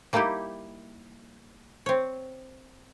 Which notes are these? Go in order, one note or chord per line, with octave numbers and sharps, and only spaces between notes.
G3 A#3 D#4 E4 G4
C4 C#5